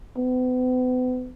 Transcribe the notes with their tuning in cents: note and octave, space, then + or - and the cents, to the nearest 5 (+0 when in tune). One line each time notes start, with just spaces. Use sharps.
B3 +40